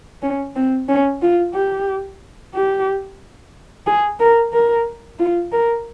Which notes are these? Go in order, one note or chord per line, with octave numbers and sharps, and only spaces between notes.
C#4
C4
C#4
F4
G4
G4
G#4
A#4
A#4
F4
A#4